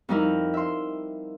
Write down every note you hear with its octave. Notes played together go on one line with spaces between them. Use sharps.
F2 G3 D#4 E4 A#4
E5 C6